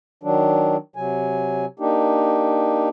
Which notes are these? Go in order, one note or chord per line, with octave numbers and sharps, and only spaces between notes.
D#3 F#3 D4
C3 F#3 G#5
A#3 D4 D#4 G4